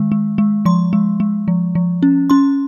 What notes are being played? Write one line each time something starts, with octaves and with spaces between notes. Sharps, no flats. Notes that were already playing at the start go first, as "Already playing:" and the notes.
Already playing: D#3 G#3
G#3
G#3
F3 C6
G#3
G#3
F3
F3
C#4
C#4 C6